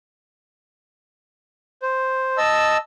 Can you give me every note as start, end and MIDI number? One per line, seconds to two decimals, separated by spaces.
1.82 2.37 72
2.38 2.77 75
2.38 2.77 81
2.38 2.77 88